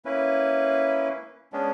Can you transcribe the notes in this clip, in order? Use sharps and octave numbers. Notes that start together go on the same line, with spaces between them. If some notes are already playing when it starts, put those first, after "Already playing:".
A#3 C#4 E4 B4
G#3 B3 C#4 D4